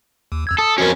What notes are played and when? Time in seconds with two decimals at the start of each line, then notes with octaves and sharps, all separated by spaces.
0.32 D#2
0.47 F2 E6 G#6
0.58 A4 D#6
0.78 F2 C#4 F#4 A#4